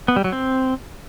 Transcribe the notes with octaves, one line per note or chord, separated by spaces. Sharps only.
B3
G3
F#3
C4